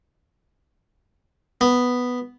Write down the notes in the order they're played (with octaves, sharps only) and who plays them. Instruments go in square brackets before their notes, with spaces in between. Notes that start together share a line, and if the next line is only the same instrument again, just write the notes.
[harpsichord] B3